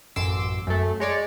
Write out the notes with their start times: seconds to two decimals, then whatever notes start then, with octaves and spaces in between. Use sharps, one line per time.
0.16 A1 F#2 C6 D6 E6 E7
0.67 F#2 A3
1.00 G#3 C#5 D5